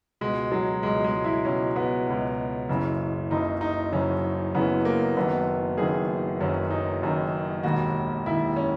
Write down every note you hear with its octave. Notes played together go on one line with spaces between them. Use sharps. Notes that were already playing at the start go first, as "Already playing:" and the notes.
C#2 B2 G#3
F#3
C#2 B2 G#3
G#3
E4
C#2 B2 C#4
B3
C#2 B2
F#1 F#2 C#3 E3
F#1 F#2 C#3 E3 D#4
D#4
F#1 F#2 C#3 E3 C#4
F#1 F#2 C#3 E3 B3
A#3
F#1 F#2 D#3 B3
F#1 F#2 D#3 G#4
F#1 F#2 D#3 C#4
D#4
F#1 F#2 D#3
E1 D#2 D#3 F#4
E1 D#2 D#3 E4
C#4